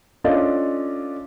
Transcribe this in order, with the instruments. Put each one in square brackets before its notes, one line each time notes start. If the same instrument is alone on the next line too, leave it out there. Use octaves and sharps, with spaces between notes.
[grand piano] C#4 D4 F4 A4 D5 D#5